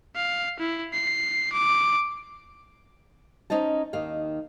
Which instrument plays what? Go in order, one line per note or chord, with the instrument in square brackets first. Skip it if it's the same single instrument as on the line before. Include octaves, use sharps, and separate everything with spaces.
[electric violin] F5
E4
C7
D6
[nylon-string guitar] C#4 D#4 C5 D#5 A5
D#2 D#3 F5